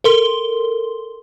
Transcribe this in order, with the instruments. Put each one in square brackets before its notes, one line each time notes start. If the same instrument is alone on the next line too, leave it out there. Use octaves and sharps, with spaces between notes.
[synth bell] A4 A#4 C6 G7